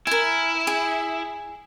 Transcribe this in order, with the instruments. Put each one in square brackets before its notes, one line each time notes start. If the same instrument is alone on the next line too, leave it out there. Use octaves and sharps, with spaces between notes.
[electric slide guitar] E4 [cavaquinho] A#4 G#5
[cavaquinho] G#4